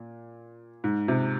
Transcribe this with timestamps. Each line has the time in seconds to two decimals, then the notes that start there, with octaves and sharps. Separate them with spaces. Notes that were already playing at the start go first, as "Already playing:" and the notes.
Already playing: A#2
0.84 G#2
1.08 C3